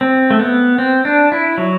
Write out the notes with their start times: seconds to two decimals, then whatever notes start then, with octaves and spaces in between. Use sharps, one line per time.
0.01 C4
0.31 A3
0.39 B3
0.78 C4
1.05 D4
1.32 E4
1.58 F#3